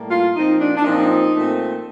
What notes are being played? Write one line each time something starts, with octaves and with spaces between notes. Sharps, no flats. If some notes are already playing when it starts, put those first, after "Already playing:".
Already playing: A2 G3 A#3
F4
A#2 F3 C4 D#4
D4
D4
A#2 F3 C4 D#4
A#2 A3 C4